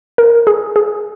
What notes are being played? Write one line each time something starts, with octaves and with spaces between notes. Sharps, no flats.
A#4
G#4
G#4